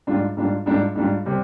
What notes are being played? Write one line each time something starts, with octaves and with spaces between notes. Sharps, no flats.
G#2 G3 D4 F4
G#2 G3 D4 F4
G#2 G3 D4 F4
G#2 G3 D4 F4
C3 G3 C4